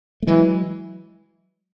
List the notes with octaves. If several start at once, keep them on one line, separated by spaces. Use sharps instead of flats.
A3
E3 F#3 G#3